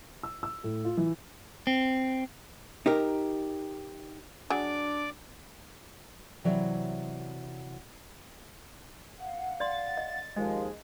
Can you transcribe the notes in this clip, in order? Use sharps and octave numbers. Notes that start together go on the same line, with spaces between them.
E6
E6
A2
F4
E3
C4
D#4 G4 A#4
F#3 D4 G#4 D5 D6
C3 E3 F#3 E4 D5 E5
F5 F#5
D5 C6 A6
D#5
D#2 F3 G#3 D#5